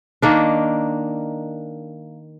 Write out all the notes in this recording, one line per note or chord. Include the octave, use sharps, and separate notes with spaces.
D#3 A#3 D4